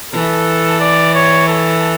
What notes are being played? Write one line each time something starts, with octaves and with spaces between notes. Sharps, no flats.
E3 A4
D5
C#5
A4